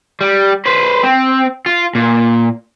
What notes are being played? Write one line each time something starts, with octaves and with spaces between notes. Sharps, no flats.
G3
B4 C5
C4
F4
A#2